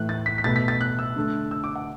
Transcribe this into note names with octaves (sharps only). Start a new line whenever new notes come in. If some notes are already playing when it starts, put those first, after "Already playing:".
Already playing: A2 E3 A3 F#6
A6
B6
B6
B2 A3 A6
B6
A6
F#6
E6
D3 A3
E6
D6
F#5